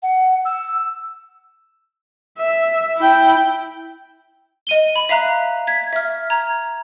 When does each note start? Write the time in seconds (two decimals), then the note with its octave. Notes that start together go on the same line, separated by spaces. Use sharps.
0.03 F#5
0.45 E6
2.39 E5
2.98 E4 G5
4.67 D#5 D#7 G7
4.96 B5
5.09 E5 F5 A#5 F#6
5.67 G#6 B6
5.93 E5 F6
6.30 A#5 G#6